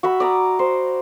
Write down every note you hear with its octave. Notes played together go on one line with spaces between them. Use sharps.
F#4 E5 B5
D5 A#5 D#6
C5